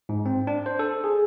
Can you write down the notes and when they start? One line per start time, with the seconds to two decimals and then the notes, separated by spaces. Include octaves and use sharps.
0.09 G#2
0.26 C4
0.47 D4
0.66 C5
0.79 A4
1.04 G#4